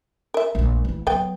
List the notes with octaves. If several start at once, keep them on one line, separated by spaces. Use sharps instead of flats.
A#4 E5
A#1 A3
E3 E4
F#3 B3 G5